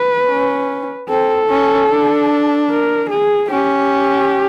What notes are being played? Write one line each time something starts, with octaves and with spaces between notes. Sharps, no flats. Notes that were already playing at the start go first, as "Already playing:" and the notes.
Already playing: B4
C#4
C4 A4
C#4
D4
A#4
G#4
C#4 G4